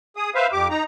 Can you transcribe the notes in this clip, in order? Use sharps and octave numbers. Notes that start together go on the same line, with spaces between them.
G#4 D#6
B4 C5 E5 F5
F2 G4 D6
D#4 A#5